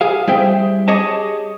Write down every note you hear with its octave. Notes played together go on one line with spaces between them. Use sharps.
G4 G#4 F5
G3 E4 G#4 C5 E5 G5
G4 G#4 C#5 D#5 A5